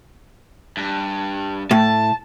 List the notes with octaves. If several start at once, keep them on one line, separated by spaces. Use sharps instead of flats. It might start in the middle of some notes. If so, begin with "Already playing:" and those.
G2
A2 A5